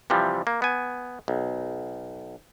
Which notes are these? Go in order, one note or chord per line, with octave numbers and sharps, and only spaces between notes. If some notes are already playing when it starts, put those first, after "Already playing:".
C3 E3 F3 G3
A#3
B3 G#5
B1